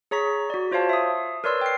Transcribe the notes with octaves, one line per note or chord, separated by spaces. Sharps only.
G#4 C#5 A#5 C#6 B6
F#4 D5
F4 C5 C#5 F5 A5
E5 D#6
A#4 B4 C#5 D5 C6 E6
G5 C7